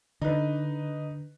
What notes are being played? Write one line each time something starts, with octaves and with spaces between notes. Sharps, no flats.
D3 D#4 B4